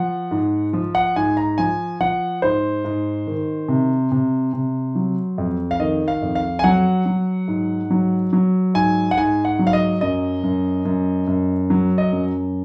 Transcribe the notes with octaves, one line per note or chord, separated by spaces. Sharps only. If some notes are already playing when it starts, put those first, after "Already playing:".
Already playing: F3 F#5
G#2
F3
F#5
G#2 G#5
A#5
F3 G#5
F3 F#5
G#2 C5
G#2
D#3
C3
C3
C3
F#3
F2
F5
D#3 D#5
F5
F2
F5
G#5
F#3 F#5
F#3
G#2
F#3
F#3
G#2 G#5
F#5
G#2 G#5
F#5
F#3
F5
D#5
F#2 D#5
F#2
F#2
F#2
F#3
D#5
F#2